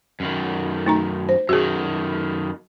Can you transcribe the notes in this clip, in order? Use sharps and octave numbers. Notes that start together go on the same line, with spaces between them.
F#2 D#3
A3 D#4 A#5
C5
F#2 D#3 F#4 G#4